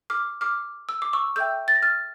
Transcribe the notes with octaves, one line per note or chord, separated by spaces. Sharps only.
D6 F6
D6 F6
E6
D6
C#6 E6
A4 E5 G5 E6 G6
A6
A#6
F6 A6